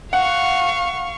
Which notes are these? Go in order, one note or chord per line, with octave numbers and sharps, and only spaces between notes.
F5 F#5 C#6